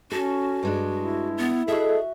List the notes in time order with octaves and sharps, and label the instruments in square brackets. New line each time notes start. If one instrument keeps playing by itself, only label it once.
[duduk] C#4 [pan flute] F#4 [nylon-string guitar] A4
[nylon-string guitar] G2 G#3 D4
[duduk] E4
[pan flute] B3
[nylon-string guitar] F#4 E5 [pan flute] G#4 [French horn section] A4 D#5